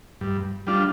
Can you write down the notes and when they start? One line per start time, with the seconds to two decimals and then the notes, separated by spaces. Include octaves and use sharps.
0.21 G2
0.67 G3 D4 F4